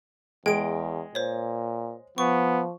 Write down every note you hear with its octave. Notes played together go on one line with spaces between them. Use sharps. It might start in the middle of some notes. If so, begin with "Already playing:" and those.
E2 G#3 G5 D7
A#2 C5 C#5
F3 B3 C#6